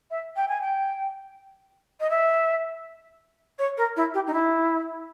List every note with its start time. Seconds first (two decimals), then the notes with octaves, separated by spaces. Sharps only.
0.10 E5
0.36 G5
0.48 G#5
0.61 G5
2.00 D#5
2.10 E5
3.59 C#5
3.77 A#4
3.96 E4
4.14 G4
4.27 D#4
4.33 E4